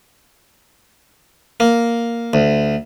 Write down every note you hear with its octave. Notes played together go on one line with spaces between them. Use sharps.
A#3
D2